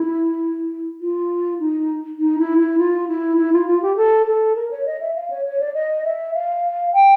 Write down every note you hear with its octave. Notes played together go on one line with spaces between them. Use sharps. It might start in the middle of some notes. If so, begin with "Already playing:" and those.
Already playing: E4
F4
D#4
D#4
E4
E4
F4
E4
E4
F4
F4
G4
A4
A4
A#4
C#5
D#5
E5
F5
C#5
C#5
D5
D#5
E5
F5
G5